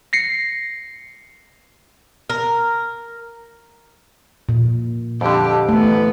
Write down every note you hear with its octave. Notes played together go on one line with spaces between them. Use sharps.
A#6 C7 C#7
A#4
A#2
F2 D3 G4
E3 A3 B3